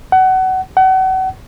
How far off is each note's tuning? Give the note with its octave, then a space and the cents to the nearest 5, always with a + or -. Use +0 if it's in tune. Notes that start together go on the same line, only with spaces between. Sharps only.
F#5 +25
F#5 +35